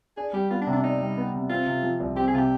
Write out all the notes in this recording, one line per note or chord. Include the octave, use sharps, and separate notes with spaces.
D4 G#4
G3 G4
B3 F4
D4
C3
D4
D4 D#4
G3
B3
C3
C4 F4
C3
F3
C2
C4 G4
G#4
C3 F4
G4